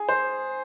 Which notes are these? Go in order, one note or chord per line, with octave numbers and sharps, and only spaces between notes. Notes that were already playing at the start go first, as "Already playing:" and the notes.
Already playing: G#4
C5